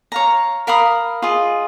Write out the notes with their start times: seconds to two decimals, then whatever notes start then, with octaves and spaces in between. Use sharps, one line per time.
0.12 C#5 F5 A#5
0.67 A#4 F5 B5 D#6
1.22 F4 G#4 D#5